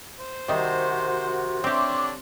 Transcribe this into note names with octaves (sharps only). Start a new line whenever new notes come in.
C5
C3 D#3 G3 F#4 A#4
D3 C4 D4 G4 C#5 E5 C6 D6